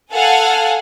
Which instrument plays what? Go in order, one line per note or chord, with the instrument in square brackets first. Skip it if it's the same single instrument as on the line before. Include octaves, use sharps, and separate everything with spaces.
[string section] A4 F5 F#5 G#5